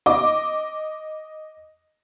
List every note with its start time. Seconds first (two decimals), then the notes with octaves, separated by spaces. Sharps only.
0.06 D#5 D6